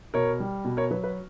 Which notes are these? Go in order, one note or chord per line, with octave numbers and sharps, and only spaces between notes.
B2 A#4 C#5
G3
B2
A#4 C#5
F#3 B4
B4